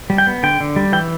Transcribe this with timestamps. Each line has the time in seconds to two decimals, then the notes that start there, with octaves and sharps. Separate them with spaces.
0.10 G3
0.18 G5
0.27 B3
0.43 D3 G5
0.60 D3
0.76 G3
0.93 E3 G5